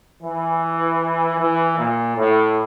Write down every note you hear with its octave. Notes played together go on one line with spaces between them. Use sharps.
E3
E3
A#2
A2